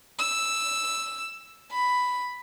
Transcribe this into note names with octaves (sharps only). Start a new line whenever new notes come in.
E6
B5